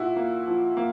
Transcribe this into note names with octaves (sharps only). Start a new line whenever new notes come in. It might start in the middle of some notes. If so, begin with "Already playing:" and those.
Already playing: A#2 E4 F#4
A#3
F3
A#3